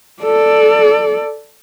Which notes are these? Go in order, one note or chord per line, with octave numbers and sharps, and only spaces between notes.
A4 D5